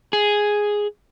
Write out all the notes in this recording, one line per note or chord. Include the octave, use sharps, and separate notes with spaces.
G#4